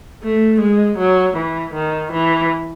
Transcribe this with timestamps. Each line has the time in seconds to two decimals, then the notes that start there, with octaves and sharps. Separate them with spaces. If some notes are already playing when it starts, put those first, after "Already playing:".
0.24 A3
0.61 G#3
0.98 F#3
1.37 E3
1.74 D#3
2.12 E3